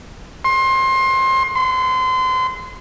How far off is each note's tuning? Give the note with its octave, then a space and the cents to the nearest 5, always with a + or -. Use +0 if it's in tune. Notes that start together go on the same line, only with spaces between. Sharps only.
C6 +25
C6 -30